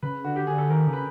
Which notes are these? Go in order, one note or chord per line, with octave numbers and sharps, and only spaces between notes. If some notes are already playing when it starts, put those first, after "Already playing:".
C#3 B4
D3 F#4
G4
D3 G#4
A4
D#3 A#4
C#3
B4